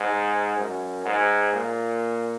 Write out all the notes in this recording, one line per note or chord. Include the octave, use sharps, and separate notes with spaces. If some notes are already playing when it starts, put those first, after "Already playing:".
Already playing: G#2
F#2
G#2
A#2